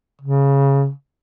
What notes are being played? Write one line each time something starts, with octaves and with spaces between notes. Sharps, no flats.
C#3